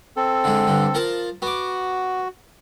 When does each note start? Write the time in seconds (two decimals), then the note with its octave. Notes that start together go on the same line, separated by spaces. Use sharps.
0.17 C4 A4
0.44 D3 G#3
0.67 G2 D3
0.94 F3 A#4 A5
1.42 B3 F#4 D6